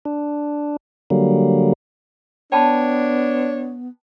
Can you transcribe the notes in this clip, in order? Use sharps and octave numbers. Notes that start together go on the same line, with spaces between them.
D4
D3 F#3 G3 A#3
B3 D4 C#5 G5 A5 B5